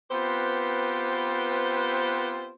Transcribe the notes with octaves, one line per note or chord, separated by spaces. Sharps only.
B3 C4 F4 G4 B4 C5